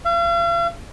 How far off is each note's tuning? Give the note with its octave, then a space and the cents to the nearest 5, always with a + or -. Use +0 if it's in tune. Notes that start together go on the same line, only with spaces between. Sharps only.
F5 -45